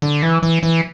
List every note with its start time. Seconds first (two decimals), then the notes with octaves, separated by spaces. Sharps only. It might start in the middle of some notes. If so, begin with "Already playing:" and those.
0.02 D3
0.22 E3
0.43 E3
0.63 E3